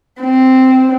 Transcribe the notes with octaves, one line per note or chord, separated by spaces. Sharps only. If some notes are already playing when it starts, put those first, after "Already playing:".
C4